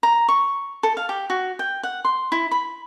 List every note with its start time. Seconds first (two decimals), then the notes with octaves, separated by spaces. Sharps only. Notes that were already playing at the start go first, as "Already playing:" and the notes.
0.03 A#5
0.29 C#6
0.83 A4
0.97 F5
1.09 G4
1.30 F#4
1.59 G5
1.83 F#5
2.05 C6
2.32 E4
2.51 B5